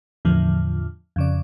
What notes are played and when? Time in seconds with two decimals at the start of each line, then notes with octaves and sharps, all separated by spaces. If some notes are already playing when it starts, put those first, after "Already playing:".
0.25 E2 A2 D3 F3
1.16 F2 C#3 D5